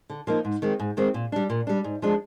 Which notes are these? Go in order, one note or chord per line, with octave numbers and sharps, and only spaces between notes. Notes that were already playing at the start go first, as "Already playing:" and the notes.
D3
F3 A#3 D#4
G#2
D#3 G#3 C4
G#2
D#3 G#3 C4
A#2
G3 D4
A#2
G3 D4
G#2
F3 G#3 D4